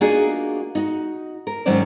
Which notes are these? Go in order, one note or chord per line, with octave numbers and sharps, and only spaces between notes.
A#3 D4 D#4 F4 F#4 G#4
D#4 F#4
A#4
G#2 D#3 F#3 C#4 C5 D5